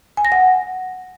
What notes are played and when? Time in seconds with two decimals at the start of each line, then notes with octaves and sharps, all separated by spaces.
0.17 G#5
0.25 A#6
0.32 F#5